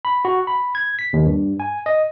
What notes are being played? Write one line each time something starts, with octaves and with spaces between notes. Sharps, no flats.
B5
F#4
B5
G#6
B6
D#2
G2
G#5
D#5